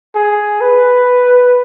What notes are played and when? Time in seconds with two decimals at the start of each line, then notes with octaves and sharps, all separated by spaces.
0.15 G#4
0.61 B4